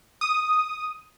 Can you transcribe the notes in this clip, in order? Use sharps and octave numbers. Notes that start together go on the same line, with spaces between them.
D#6